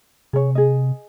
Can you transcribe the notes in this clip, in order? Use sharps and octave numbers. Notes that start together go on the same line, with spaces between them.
C3 G#4 C#5
G#4 D#5